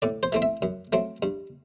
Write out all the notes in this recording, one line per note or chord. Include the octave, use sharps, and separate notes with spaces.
A2 D5
C5
E3 A3 C4
E5
F#2
F#3 A3 C4
G2